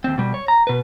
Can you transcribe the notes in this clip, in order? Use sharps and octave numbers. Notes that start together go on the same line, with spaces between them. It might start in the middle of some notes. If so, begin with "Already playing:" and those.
D#2 C4
B2 G3
C#5
A#5
B2 B4